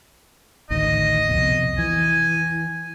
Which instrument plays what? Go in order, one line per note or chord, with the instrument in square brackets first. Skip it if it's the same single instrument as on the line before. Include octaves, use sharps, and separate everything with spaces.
[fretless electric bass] A1 D2 D#3 [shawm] D#5
[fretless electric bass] C2 F2 B2
[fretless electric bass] E3 [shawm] G#5